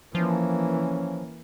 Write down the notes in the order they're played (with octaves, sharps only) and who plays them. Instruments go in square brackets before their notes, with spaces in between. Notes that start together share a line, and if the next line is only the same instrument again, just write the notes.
[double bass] E3 A#3 [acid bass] F3 [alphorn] C#4